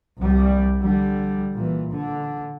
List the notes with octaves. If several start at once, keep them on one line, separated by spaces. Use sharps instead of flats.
C2 G3
D3 G3
A#2 E3
D3